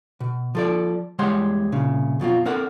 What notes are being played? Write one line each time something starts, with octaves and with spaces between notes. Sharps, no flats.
B2
F3 A4 D5
E2 G3 G#3 C#5 F#5 C6
C2 A#2 C#3
F2 B2 F#3 F4
C4 A4 A#4 D5 F#5